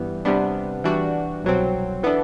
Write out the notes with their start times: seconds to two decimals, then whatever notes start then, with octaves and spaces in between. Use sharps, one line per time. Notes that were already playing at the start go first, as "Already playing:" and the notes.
Already playing: G2 E3 G3 B3
0.25 C3 G3 B3 D4
0.84 E3 G3 D4 F#4
1.44 C2 B2 F#3 C4
2.03 E3 B3 D4 A4